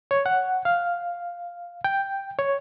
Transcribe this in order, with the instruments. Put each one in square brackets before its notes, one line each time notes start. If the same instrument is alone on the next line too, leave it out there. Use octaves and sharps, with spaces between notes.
[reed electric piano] C#5
F#5
F5
G5
C#5